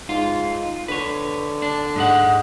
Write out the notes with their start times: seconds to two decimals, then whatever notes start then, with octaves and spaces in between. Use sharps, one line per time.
0.09 G#2 F4
0.88 D3 B4 C#5
1.62 D4
1.96 G#2 G#3 F#5